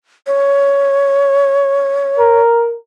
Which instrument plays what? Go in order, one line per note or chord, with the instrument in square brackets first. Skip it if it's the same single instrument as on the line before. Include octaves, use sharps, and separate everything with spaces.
[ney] C#5
[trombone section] A#4